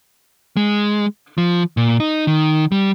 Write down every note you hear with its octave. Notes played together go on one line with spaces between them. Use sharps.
G#3
F3
A#2
D#4
D#3
G3